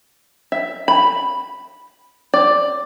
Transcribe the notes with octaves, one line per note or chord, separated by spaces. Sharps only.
E5
B5
D5